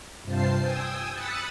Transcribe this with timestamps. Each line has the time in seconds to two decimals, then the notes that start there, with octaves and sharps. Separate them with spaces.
0.24 G2 C3 F4 C5 A5 C7
0.60 G5 G#5 D#6 E6
1.12 B5 D#6 E6 F#6 A6 C#7